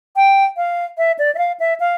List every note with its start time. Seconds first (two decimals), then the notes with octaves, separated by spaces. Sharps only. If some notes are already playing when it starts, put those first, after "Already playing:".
0.16 G5
0.57 F5
0.98 E5
1.19 D5
1.35 E5
1.38 F5
1.60 E5
1.80 F5